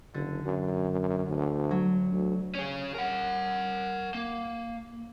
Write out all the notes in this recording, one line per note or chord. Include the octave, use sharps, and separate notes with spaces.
F#1 D3
F#2
D2
F#3
D2
C#4 G#4
A#4 F#5
A#3